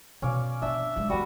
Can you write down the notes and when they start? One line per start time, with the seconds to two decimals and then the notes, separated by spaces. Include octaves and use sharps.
0.22 B2 C#4 D5 F5
0.62 B3 C#4 D4 E5
0.96 B1 G#3
1.10 E3 G3 B3 F#4 B4